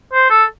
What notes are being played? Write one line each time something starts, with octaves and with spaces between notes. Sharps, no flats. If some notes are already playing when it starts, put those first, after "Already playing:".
C5
A4